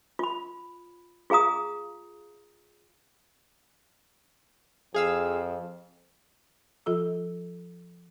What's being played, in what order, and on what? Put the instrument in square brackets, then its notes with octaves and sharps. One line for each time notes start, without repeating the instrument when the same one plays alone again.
[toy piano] F4 B5
F4 G#4 F5 A#5 D#6
[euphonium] F2 [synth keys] G#4 F5 E6
[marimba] F3 F4 A4 E6